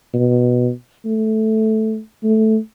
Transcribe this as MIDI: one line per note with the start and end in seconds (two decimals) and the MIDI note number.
0.14 0.71 47
1.05 1.99 57
2.23 2.57 57